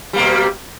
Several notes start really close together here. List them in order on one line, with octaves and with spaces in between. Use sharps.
G3 A#3 B2